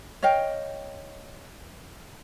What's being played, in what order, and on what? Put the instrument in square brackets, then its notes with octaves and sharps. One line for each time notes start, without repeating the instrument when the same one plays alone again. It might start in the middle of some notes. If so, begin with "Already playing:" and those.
[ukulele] C#5 D#5 F5 G5